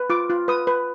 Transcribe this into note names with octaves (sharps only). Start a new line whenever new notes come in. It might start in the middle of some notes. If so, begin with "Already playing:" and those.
Already playing: B4
F4 D6
F4
B4 D#6
B4